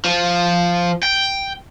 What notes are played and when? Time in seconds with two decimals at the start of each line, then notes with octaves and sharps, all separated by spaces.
0.05 F3
1.03 G5